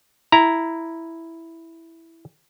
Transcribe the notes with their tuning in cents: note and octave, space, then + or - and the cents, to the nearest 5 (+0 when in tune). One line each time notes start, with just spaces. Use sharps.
E4 +0 A#5 +0